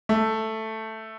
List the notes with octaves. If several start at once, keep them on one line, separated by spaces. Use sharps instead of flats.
A3